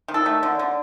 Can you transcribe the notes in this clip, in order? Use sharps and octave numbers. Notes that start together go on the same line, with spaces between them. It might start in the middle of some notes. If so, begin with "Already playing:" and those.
D#3
A4
A3
D3
D3